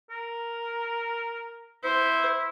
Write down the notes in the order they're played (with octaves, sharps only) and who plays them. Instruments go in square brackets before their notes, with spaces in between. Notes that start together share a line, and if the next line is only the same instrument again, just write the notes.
[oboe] A#4
[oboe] E4 [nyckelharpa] C5